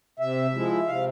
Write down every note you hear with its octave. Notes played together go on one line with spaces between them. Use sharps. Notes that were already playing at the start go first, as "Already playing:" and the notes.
C3 E5
F3 G#3 E4
C3 F5